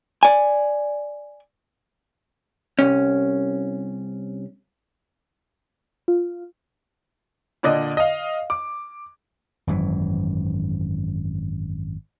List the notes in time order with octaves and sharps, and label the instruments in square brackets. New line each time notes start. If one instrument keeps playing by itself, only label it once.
[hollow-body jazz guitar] D5 G#5
C2 C#4
[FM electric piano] F4
[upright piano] A#2 D3 D5 D#5
D#5 F5
D6
[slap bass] G#1 F#2 E3